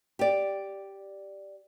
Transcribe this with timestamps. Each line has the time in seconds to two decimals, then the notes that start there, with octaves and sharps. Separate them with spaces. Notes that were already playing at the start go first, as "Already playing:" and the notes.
0.19 G4 D5